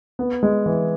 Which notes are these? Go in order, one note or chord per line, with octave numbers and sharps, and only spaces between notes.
B3
G#3
E3